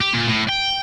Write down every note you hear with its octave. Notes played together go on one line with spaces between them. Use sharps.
G4
A#2
A2
G5